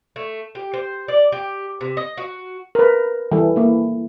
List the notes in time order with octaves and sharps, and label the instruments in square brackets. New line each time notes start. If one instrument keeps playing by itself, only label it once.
[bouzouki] A3
G4
C5
D5
G4
C3
D#5
F#4
[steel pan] A#4 B4
E3 G3 A4
A#3 E4